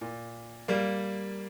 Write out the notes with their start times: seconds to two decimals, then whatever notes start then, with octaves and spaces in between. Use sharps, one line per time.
0.01 A#2
0.68 G3 A#3